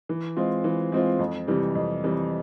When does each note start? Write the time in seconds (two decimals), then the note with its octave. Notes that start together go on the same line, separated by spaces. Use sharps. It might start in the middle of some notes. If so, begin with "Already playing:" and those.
0.09 E3
0.36 G#3 C4 F4
0.64 E3
0.92 G#3 C4 F4
1.19 F2
1.48 C3 E3 G3
1.75 F2
2.03 C3 E3 G3